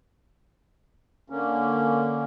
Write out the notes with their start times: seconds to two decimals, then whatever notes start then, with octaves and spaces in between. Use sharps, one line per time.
1.30 D3 A#3 C#4